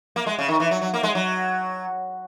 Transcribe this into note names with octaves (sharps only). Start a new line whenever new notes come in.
A#3
G#3
C#3
D#3
E3
F#3
F#3
A#3
G#3
F#3